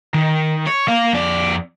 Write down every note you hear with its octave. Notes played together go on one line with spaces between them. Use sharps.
D#3
C#5
A#3 F5
F2 D5